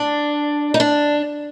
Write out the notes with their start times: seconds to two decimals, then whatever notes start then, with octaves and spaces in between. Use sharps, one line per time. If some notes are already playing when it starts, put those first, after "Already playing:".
Already playing: D4
0.74 D#4
0.80 D4